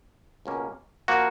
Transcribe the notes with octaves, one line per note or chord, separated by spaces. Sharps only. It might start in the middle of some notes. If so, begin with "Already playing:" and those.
C#2 B2 A#3 C#4
F3 A#3 F#4